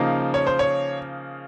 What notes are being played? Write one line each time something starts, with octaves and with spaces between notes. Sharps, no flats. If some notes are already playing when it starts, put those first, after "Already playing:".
Already playing: C#3 F3 A#3 D#4
C#5
C5
C#5